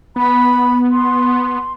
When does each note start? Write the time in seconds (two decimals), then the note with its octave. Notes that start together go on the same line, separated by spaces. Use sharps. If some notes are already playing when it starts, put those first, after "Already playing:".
0.16 B3 B5
0.91 C6